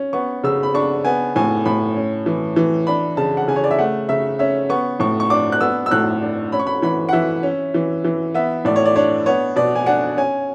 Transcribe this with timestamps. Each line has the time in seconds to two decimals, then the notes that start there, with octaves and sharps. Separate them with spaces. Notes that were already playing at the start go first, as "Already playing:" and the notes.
Already playing: C#4
0.13 B3 C#6
0.43 C#3 E6
0.63 B5
0.74 D4 C#6
1.05 B3 G#5
1.36 A2 G#5
1.66 A2 B5
1.96 C#4
2.26 E3
2.56 E3
2.87 D4 B5
3.17 C#3 A5
3.37 F#5
3.48 C#3 G#5
3.56 C#5
3.64 D5
3.71 E5
3.78 A3 F#5
4.09 C#3 E5
4.39 C#4 E5
4.69 B3 C#6
5.00 A2 C#6
5.20 C#6
5.30 D4 D6
5.52 F#6
5.61 B3 E6
5.86 E6
5.91 A2 F#6
6.22 D4
6.52 C#4 B5
6.60 C#6
6.67 B5
6.82 E3 B5
7.09 F#5
7.13 E3 E5
7.43 C#4
7.74 E3
8.04 E3
8.34 B3 E5
8.65 A2 D5
8.76 C#5
8.86 D5
8.96 D4 C#5
9.26 B3 C#5
9.56 B2 D5
9.75 G#5
9.86 D4 F#5
10.17 C#4 G#5